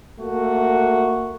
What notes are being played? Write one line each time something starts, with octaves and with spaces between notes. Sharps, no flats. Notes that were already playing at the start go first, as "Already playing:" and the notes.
A3 A#3 F#4